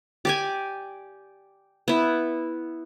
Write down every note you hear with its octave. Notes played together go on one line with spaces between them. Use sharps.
G4 D5 G#5
B3 E4